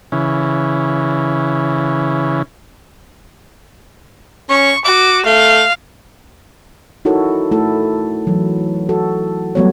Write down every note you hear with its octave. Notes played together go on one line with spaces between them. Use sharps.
C#3 E3
C#4 C#6
F#4 D6
A3 F5
D#4 E4 F#4 A4 A#4 C#5
A3 E4 A4
E3 F#3
F#4 A4
F#3 G3 A3 B3 F#4 C#5